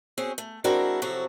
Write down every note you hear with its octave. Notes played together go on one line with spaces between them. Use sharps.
C4 C#4 F#4 G#4
A3
G#3 C4 D4 E4 F#4 A#4
C3 F3 F#3 C4 F#4 A4